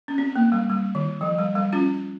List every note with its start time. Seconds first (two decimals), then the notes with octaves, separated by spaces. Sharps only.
0.08 C#4
0.18 C4
0.36 A#3
0.52 G3
0.70 G3
0.95 D#3
1.21 F3
1.39 G3
1.55 G3
1.73 C#4 F4